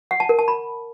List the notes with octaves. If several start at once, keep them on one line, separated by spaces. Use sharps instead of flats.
F#5
A5
A#4
A5
B5